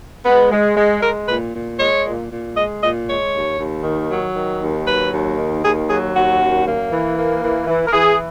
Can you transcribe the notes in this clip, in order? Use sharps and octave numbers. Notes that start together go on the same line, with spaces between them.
G#3 B3
G#3
G#3
G#3 A#4
A#2 B4
A#2
G#3 C#5
A#2
A#2
G#3 D#5
A#2 D#5
G#3 C#5
D#2
D#2
D#3
F#3
D#3
D#2
F#3 B4
D#2
D#3
D#2 G#4
F#3 G#4
D#2 F#4
F#2
A#3
E3
A#3
E3
E3
A#4
E3 G#4